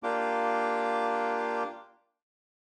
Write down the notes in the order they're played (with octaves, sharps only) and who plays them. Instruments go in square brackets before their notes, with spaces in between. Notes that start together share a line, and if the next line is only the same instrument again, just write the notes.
[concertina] A#3 D4 F4 G4 D6